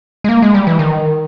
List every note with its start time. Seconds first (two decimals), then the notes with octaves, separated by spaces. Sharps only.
0.24 G#3
0.29 A#3
0.42 G#3
0.54 G3
0.67 E3
0.79 D#3